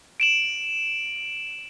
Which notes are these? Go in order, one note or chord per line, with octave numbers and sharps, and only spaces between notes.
D7 E7 F#7